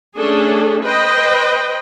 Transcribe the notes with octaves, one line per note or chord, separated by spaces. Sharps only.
A3 C#4 D4 G#4 A4
B4 C5 D#5 G5